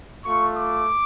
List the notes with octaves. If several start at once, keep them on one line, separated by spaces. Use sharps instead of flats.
A3 F4 C#6
D6